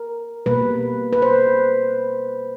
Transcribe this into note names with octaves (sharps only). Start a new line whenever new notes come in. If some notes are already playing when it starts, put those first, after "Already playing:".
Already playing: A#4
B2 G3 A#3 B4
B4
C5